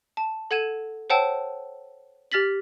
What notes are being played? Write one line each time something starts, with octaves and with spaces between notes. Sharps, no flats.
A5
A4 F#5 G#6 D#7 E7
C5 C#5 F#5 G5 A5 E6
G4 F6 A6 B6 F#7